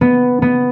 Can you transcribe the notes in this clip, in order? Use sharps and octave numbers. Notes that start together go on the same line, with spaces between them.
B3
B3